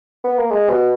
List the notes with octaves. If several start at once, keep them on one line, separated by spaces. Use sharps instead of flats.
B3
A#3
G#3
B2